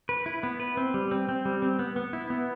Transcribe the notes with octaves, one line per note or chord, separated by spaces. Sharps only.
B4
E4
B3
B4
C4
G3
C4
C4
G3
C4
B3
B3
E4
B3